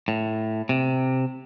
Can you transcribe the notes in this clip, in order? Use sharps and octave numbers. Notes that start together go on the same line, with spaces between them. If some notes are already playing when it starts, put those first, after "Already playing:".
A2
C3